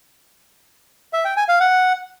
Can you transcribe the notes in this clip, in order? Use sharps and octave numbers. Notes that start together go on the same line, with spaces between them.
E5
G5
G#5
F5
F#5